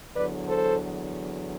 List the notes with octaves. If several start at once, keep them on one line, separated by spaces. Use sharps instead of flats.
E2 D3 F#3 B4 D5
A4 C5